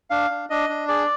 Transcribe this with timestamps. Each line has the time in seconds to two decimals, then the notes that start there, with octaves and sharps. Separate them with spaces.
0.10 D4 F5
0.30 D4
0.50 D4 D#5
0.69 D4
0.88 G#4 D5